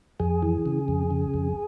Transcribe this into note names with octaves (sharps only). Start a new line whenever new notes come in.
F2 G#4
E3
C#3
F2
C#3
F2